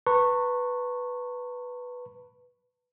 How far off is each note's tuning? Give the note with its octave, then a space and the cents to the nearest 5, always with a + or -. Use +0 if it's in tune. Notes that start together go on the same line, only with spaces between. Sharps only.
B4 +0 A5 +45 C#6 -15